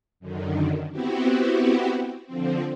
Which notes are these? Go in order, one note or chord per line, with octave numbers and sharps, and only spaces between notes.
F#2 D3 D#3
B3 C4 E4 F#4 G4
D3 F3 C4